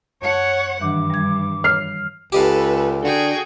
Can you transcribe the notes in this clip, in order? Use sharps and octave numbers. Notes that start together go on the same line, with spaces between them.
F#2 C#5 F#5 A5
G2 D#3 E3 D4 D6
G3 G#6
C#5 F6 C7
C#2 G4 A4 B4 D#5 F5
D3 F#4 G#4 G5